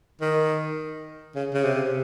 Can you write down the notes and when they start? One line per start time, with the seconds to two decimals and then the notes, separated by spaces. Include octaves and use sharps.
0.21 D#3
1.35 C#3
1.54 C#3
1.64 C3